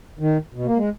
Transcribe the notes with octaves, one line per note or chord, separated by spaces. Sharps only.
D#3
B2
A#3
G#3